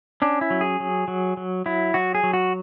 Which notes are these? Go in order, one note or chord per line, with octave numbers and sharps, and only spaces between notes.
C#4 D4
E4
F#3
G#4
F#3
F#3
F#3
F#3 E4
F#3 F#4
G#4
F#3
F#4